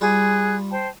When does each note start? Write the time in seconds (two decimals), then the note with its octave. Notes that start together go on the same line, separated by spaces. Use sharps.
0.01 G3 F4 G#4 F#6
0.70 C5 G5 A5